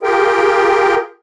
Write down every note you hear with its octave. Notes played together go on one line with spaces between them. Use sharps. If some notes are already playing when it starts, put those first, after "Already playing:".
F4 G4 G#4 A#4 G5